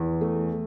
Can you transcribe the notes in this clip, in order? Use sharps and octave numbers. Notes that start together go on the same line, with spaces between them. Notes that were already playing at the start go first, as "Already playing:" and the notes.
Already playing: E2
A3